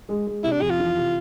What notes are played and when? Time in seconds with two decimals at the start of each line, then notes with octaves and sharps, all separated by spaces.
0.09 G#3
0.27 G#3
0.44 C3 E4
0.52 D4
0.61 F2 G#4
0.70 F4
0.80 E3
0.97 C3